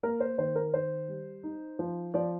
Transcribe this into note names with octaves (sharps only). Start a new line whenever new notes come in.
A#3 A#4
C5
D#3 C5
A#4
D#3 C5
G3
D#4
F3
F3 D5